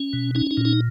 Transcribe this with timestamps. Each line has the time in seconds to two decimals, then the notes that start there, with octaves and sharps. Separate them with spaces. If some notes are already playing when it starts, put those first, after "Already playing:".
Already playing: C#4
0.13 B2
0.35 C#4 D#4
0.51 D#4
0.57 A#2
0.65 D#4